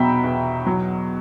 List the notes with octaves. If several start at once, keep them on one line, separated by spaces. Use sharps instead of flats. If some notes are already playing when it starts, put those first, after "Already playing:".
Already playing: E2 B2 F#3 E5 G5 A#5 B5
E2
F#3